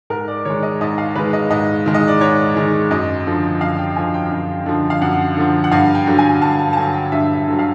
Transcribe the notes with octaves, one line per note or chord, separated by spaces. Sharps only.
G#2 A#4
D5
D#3 G#3 C#5
D#5
G#2 D#5
F5
D#3 G#3 B4
D#5
G#2 D#5
D#3 G#3
D#5
D5
G#2 C#5
D#3 G#3
F#2 D#5
D3 F3
F#2 F5
G5
D3 F3 G#5
G5
F#2
D3 F3
F5
F#2 F#5
D3 F3
F#5
G2 F5
G5
D3 F#3
G#5
G2 A5
A5
A5
D3 F#3 G#5
G5
G2 E5
E5
D3 F#3
F5